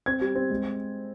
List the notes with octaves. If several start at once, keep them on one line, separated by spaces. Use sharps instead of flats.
C4 G#6
G3
C4
G#3